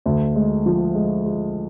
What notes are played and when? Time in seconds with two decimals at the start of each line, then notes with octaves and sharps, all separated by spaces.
0.06 D2
0.36 G#3
0.66 F3
0.95 G#3
1.26 G#3